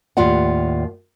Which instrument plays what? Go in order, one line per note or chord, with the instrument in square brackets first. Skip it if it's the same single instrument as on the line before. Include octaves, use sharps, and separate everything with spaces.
[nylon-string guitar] D#2 A2 F4 D5 F#5